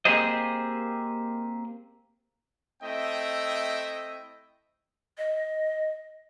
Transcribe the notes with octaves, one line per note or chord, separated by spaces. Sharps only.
A#3 C4 G4 G#4 C5 D#5
A3 C4 E4 D#5 E5 G5
D#5